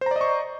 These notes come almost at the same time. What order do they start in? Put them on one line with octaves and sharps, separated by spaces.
C5 A#5 D5 D#5 C#6